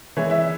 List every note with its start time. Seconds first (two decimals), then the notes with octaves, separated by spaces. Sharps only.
0.17 E3 G#3 E4 C#5
0.30 E4 E5